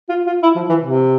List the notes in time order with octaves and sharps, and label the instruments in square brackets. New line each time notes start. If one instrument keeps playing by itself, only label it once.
[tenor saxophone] F4
F4
E4
F3
E3
C3